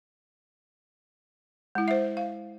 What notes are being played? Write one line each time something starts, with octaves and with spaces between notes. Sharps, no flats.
G#3 E4
C5 E5
F5